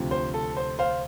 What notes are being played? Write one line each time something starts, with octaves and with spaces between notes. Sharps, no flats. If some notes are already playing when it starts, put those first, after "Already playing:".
Already playing: D2 C3 F3
C5
A4
C5
C5 F5